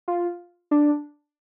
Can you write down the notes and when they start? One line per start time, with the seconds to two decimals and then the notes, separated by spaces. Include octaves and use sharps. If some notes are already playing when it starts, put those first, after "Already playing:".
0.08 F4
0.71 D4